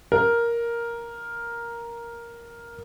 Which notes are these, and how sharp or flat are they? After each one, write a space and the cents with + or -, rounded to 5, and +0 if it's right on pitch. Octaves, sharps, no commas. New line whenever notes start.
A#4 +5